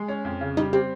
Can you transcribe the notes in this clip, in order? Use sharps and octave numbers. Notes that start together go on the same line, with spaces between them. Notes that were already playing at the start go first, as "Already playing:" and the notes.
Already playing: G#3
C#4
F2
C#3
G3 D#4
C4 G4